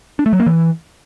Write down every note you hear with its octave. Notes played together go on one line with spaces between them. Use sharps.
D4
A3
F#3
A#3
E3